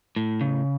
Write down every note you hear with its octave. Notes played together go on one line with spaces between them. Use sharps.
A2
C#3